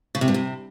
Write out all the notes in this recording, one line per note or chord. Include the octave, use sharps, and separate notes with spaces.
C#3
C3
G2
C3